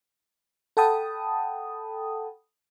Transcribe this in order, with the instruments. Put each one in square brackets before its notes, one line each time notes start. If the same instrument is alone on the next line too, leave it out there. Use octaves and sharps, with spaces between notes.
[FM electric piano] A4 F#5 G5 A5 B5 D#6